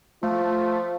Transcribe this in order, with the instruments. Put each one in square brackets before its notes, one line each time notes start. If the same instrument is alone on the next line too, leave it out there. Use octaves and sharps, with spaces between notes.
[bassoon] F3 [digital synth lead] A3 [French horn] F4